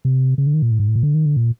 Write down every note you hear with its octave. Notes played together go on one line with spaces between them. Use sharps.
C3
C#3
D3
D#3
A#2
A2
G#2
A2
A#2
D3
D#3
D3
A#2